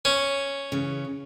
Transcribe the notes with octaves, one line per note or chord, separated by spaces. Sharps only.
C#4
C#3 E3